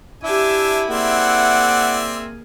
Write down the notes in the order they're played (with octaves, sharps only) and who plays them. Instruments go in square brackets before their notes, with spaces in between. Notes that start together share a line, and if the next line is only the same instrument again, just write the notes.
[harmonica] D4 E5 [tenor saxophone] E4 [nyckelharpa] G4 G#5
[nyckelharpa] A#3 G#4 [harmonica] C4 D5 E5 [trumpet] F#5